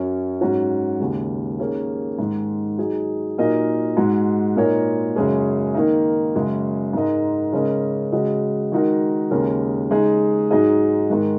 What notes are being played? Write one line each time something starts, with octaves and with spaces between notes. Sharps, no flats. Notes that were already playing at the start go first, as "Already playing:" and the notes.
Already playing: F#2 F#3 C#4
G#2 F#3 C#4 F#4
D#2 C#3 G#3
D#3 A#3 C#4 G#4
G#2 D#3 G#3
F#3 D#4 G#4
A#2 F#3 D#4 A#4 D#5
G#2 G#3 F#4
A#2 A#3 D#4 A#4 C#5
F#2 C#3 G#3 C#4 G#4
D#3 A#3 D#4
F#2 C#3 G#3
G#2 G#3 D#4 A#4 D#5
C#3 G#3 C#4 A#4 D#5
C#3 G#3 F#4 D#5
D#3 G#3 D#4 F#4 A#4
D#2 C#3 G#3 C#4 A#4
C#3 G#3 D#4 G#4
G#2 F#3 D#4 G#4 D#5
G#2 D#3 G#3